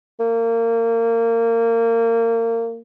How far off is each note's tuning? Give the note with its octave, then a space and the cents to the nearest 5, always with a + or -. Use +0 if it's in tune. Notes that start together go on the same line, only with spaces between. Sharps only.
A#3 -25